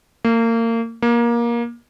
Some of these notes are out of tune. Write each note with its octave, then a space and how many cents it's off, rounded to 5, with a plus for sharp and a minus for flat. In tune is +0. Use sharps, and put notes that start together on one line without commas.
A#3 -30
A#3 +20